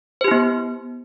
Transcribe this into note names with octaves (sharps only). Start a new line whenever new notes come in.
B3 E4 G4 C5